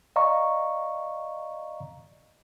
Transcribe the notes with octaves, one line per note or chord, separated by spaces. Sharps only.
D5 D#5 F5 A#5 C#6